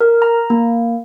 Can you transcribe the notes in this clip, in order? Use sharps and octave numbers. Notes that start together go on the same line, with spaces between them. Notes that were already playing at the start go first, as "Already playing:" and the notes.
A#4
A#5
A#3